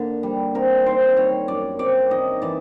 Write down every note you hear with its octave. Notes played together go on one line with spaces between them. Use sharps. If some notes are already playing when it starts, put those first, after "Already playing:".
Already playing: D3 A#3
G3
C4 A#4
D#3 C5
G3 C#5
F#2 D5
C4 D5
D#3 D#5
E3 D5